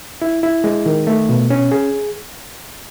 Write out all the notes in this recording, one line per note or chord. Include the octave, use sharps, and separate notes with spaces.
E4
E4
G#3
D#3
A3
B2
C#4
G#4